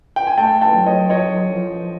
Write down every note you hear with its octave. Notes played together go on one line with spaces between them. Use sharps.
G5
G#5
A3 G5 A5
G5 A5
F#3
C#5 D#5
F#3 C#5 D#5
F3